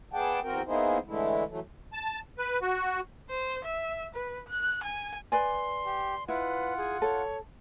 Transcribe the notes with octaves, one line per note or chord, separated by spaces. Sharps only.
B3 G#4 D5 F#5 G5 A5
E2 C4 F#4 A#4 G5
A#3 B3 D#4 E4 G#4 C5
D3 E3 G#3 A3 E4
E3 F#3 A3
A5
B4
F#4
C5
E5
B4
F#6
G#5
B4 D5 G#5 C6
G4
E4 F4 B4 F#5
G#4
A4 C#5